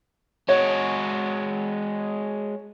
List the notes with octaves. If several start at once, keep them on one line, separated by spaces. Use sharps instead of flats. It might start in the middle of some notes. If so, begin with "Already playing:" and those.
G#3 F#4 C#5